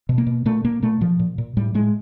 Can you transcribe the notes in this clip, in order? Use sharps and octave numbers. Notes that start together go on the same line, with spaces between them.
B2
A#3
B2
A#2 A3
A#2 A#3
A#2 A3
A#2 F3
A#2
A#2
A2 G3
A2 G#3